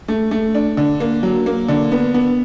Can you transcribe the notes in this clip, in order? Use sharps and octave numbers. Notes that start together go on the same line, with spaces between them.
A3
A3
D4
D3
A#3
F#3
A#3
D3
B3
B3